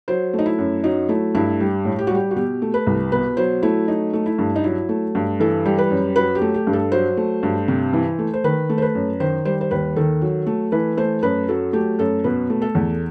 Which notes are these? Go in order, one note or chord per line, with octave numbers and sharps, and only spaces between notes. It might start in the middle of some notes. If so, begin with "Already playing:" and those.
F#3 C5
A3
D#4
E4
F#2
F#3 D#4
A3 E4
G2 E4
G3
A2
G4
F#4
G3 G4
F#4
B2 G4
A3
B4
C2
B2 B4
F#3 C5
A3 E4
F#3 D#4
A3
E4
G2
D#4
F#3 E4
A3
G2
E3 A4
G3
B4
F#2
F#3 B4
G4
A3
G4
G2
A4
F#3 C5
A3
G2
C3
E3
A3
C5
D#3 B4
A3
C5
B4
F#2
D#3 C5
G3 C5
C5
D#2 B4
D#3 A4
F#3
A3
E3 B4
A3 C5
F#2 B4
F#3 A4
A3 G4
F#2 A4
B2 B4
A3
A4
E2